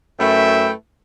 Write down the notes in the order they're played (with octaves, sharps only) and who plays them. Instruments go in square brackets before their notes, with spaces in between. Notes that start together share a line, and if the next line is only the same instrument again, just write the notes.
[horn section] F#2 A3 E4 B4 E5 G5